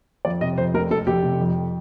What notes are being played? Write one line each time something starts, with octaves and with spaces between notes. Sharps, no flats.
F2 D5
C3 D#5
F2 C5
F1 A#4
F1 A4
F1 G4
C3
F2